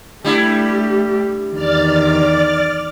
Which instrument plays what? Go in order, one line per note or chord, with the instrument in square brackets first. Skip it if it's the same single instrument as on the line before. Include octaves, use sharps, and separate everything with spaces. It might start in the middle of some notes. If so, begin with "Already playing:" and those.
[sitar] G3 D4 E4 [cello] A3 G4
[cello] E2 D#3 [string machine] D5 F6 A6